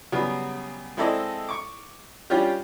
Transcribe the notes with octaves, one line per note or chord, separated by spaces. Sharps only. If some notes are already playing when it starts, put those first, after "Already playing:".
C#3 F#3 G3 B3
G#3 C4 E4 A4 D5 D#5
C#6 D6
G3 C#4 D4 F4 G4